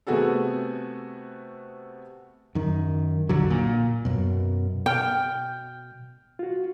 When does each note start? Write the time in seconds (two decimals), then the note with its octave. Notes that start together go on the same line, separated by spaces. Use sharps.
0.07 C3 A3 B3 F#4 G#4 A4
2.55 F#2 D#3
3.29 B1 F2 D3 F#3
3.50 A#2
4.05 F#2 B2
4.86 B2 G5 F6 G6
6.39 F4 F#4